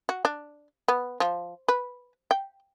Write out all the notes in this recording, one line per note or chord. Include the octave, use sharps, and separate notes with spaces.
F#4
D4
B3
F3
B4
G5